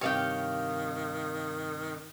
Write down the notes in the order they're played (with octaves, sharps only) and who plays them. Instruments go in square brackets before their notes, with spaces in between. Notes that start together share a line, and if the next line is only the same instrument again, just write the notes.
[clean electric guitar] G2 C3 G4 [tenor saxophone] D#3 [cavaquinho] C#5 F5 G5